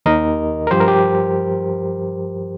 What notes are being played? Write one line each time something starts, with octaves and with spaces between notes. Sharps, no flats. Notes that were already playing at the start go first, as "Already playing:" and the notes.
D#2 D#3 A#4 D#5
A#4
G2 F3 G4 C5
A#4
G4